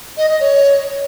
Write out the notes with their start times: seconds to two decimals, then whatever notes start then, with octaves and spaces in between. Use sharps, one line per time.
0.17 D#5
0.28 D#5
0.40 C#5